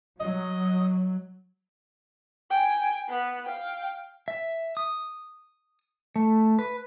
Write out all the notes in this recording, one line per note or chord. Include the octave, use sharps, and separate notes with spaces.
F#3 D#5
G5 G#5
B3
F5 G5
E5
D#6
A3
B4